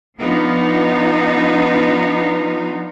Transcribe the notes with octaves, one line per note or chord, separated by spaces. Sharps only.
F3 B3 D4 D#4 F4